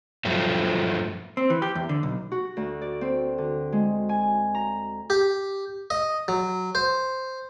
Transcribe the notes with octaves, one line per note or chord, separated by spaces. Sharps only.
G2 F3 F#3 A3
C4
E3
G4
E2
D3
B1
F#4
D2
D5
C4
D3
G#3
G#5
A#5
G4
D#5
F#3
C5